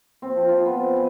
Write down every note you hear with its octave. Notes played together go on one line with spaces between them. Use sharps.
C4
F3
F4
B3
D#5
G#5